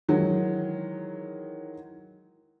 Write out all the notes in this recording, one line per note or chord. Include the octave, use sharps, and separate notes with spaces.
D#3 E3 F#3 G#3